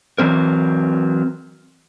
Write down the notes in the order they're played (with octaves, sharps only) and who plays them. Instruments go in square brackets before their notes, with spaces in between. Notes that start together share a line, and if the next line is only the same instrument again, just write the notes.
[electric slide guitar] E3 F#3 C4 A#4